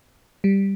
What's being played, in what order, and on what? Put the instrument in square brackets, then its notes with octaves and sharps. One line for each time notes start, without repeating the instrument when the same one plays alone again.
[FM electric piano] G3